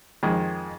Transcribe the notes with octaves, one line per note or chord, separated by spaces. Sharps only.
F2 D#3 G#3